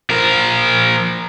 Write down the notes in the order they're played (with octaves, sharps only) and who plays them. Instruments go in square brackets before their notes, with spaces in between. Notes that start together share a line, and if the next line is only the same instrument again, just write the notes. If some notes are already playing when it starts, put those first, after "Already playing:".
[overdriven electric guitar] F3 A#4